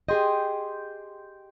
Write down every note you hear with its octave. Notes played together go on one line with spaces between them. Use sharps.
G4 G#4 D#5 G5 C6